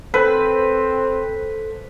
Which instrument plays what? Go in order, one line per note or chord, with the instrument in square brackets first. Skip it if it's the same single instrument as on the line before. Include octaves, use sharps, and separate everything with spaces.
[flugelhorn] C4 [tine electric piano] A4 C5 [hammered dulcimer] B4